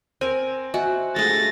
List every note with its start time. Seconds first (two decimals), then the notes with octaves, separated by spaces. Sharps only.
0.21 C4 A#4 G#5
0.74 F#4 D#5 E5 G#5
1.16 G#3 A3 A6 A#6